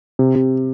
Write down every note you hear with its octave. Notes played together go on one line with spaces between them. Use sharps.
C3
C3